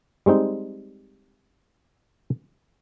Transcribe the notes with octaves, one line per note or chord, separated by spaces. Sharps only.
G3 G#3 C4 D#4